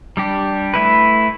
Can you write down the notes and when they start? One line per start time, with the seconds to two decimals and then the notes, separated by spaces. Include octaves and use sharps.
0.17 G3 D4 G4
0.74 A3 E4 B4